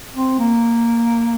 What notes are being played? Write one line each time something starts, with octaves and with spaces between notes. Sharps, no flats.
C4
A#3